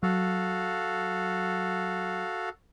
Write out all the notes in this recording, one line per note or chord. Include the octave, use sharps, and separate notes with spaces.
F#3 F#4 A4 F5